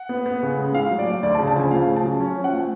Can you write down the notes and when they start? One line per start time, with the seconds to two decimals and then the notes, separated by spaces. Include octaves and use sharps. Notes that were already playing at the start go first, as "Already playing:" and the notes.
Already playing: F#5
0.09 B3
0.26 B3
0.43 C#3
0.58 G#3
0.74 A2 F5
0.91 F#3
0.99 D5
1.07 A3
1.23 D2 D5
1.35 A5
1.39 C#3
1.48 A5
1.56 F3 G#5
1.71 A3 F5
1.88 C#3
1.96 A5
2.04 F#3
2.20 C#4
2.36 F3
2.44 F#5
2.53 A3